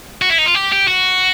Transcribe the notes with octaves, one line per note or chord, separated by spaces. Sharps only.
F#4
E4
D#4
F4
G4
G4
F#4